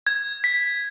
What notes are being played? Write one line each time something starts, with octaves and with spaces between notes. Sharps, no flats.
G#6
B6